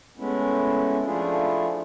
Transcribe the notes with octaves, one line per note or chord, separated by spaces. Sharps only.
G#3 A3 B3 C#4 E4
F3 A3 D4 E4 F4 G#4